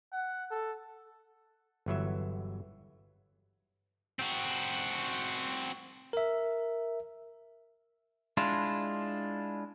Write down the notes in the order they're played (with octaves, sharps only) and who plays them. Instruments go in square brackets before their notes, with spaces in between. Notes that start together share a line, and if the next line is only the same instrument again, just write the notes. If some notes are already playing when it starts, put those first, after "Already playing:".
[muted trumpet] F#5
A4
[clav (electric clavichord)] G1 E3 F#3 E5
[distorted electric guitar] C4 F#4
[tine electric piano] A#4 E5
[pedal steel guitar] G#3 D4 E4 F4